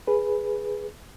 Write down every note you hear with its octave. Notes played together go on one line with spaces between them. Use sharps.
G#4 B4